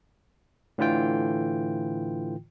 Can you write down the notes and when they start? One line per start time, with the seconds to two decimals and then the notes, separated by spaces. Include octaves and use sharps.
0.78 A2 D3 E3 F4 G5